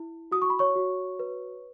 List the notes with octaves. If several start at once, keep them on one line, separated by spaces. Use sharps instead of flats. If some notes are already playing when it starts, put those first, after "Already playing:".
Already playing: E4
F#4 D#6
C#6
B5
C#5 C#6
F#4
B4